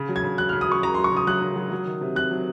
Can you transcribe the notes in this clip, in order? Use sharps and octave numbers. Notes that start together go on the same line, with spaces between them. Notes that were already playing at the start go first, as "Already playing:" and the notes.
Already playing: C#3
F#3
G#6
C#3
F#3 F#6
F6
C#3
D#6
F#3 C#6
C#3 A#5
C6
F#3
C#6
C#3 D#6
F#3 F#6
C#3
F#3
F#3
D#3
C3
C3 F#6
F#3